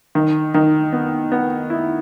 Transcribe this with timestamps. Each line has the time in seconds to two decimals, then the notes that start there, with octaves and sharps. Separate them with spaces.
0.15 D#3
0.54 D#3
0.93 B3
1.32 B3
1.70 E4